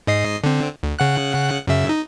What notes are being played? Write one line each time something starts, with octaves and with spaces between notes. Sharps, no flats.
G#2 D#5 C7
D3 C4
D2
C#3 F#5 F#6
F#2 C#3 E5
D#4